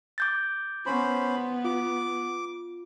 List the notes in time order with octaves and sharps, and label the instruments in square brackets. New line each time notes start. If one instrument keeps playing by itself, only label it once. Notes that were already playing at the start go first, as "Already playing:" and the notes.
[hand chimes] D6 G6 A6
[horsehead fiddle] B3 [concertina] C#4 C5 B5
[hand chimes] F4 [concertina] D6